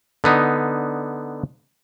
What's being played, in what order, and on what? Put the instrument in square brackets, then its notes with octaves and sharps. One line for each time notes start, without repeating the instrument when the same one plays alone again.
[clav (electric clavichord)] D3 B3 D#4